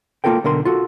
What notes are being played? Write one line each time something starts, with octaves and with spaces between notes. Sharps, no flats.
A#3 C4 F4 A4 A#4 G5
B1 D3 A#4 C6
F4 F#4 A4